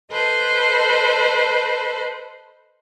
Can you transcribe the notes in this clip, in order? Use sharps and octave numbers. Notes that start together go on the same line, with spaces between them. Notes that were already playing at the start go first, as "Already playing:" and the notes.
A4 B4 C5 D#5